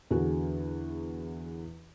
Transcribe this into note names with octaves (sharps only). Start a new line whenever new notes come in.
E2 D3 F#4 G#4